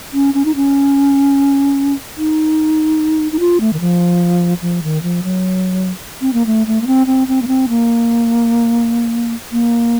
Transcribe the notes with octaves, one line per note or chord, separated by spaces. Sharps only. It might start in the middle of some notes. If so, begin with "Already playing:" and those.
C#4
C#4
D#4
C#4
D#4
D#4
F4
A3
D#3
F3
F3
D#3
F3
F#3
C4
A#3
A3
A3
A#3
C4
C4
C4
A#3
C4
A#3
A#3